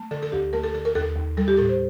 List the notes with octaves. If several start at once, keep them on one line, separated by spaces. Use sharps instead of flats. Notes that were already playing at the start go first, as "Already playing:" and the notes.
Already playing: A3
D3 A4
A4
D2 G4
A3 A#4
A4
D3 A4
A#4
D#2 A4
D#2
G3 A4
G4
A2 A4
C5